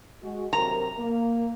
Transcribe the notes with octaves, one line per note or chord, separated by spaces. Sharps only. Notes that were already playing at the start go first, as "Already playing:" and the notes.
G#3 F#4
C3 F#3 A#4 A#5
A#3